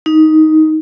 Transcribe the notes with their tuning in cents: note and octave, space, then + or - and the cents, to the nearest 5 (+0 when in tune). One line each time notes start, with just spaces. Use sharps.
D#4 +10